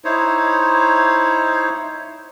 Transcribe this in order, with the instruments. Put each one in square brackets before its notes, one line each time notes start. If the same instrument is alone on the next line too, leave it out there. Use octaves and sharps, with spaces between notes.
[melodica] D#4 E4 C5 C#5